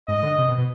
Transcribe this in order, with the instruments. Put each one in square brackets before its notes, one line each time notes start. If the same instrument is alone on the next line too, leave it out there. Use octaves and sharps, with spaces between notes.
[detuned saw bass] G#2 [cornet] D#5
[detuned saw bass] D3
C3
B2
B2